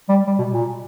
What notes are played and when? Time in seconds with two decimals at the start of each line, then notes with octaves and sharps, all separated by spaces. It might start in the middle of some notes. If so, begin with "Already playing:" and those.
0.09 G3
0.27 G3
0.39 B2
0.51 A#2